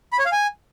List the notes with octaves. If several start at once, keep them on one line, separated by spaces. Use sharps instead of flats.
B5
C#5
F5
G#5